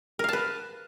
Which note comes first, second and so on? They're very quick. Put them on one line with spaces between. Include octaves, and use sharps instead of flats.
A#4 F5 A5 B4